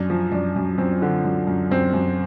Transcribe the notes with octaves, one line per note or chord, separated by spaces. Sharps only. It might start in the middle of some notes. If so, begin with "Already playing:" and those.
Already playing: F#2 D4
F3
F#2 D4
F#2
F#2 C4
D3
F#2
F#2
F#2 C4
F#2